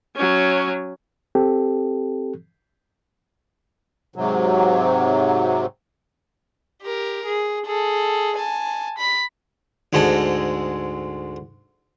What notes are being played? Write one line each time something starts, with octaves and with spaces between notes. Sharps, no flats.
F#3 C#4
C4 G4 A4
G#2 C3 F#3
G4 A#4
G#4
G#4 A4
G#5 A5
B5 B6
D2 G#2 G#3 A4